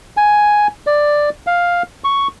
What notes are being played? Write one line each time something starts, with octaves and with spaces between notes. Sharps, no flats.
G#5
D5
F5
C#6